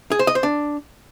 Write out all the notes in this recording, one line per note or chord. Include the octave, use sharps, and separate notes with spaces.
G#4
C5
D#5
C5
D4